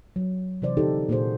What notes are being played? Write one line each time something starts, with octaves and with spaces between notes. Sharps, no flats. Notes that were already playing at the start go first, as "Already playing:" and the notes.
F#3
C3 E3 C5 D5
D3 D#4 G4 A4
A#2 A#3 F#4 G#4 C5